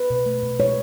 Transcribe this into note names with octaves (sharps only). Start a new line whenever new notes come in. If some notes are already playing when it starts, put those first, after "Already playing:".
Already playing: B4
B2
A3
B2
G#3 C#5